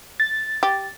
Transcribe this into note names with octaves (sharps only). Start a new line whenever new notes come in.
A6
G4